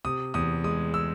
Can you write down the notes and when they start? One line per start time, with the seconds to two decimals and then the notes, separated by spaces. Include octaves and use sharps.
0.05 C3 D#6
0.34 E2 D#6
0.64 G#3 D#6
0.94 E6